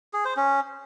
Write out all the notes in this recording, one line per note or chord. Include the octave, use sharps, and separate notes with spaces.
G#4
C5
C#4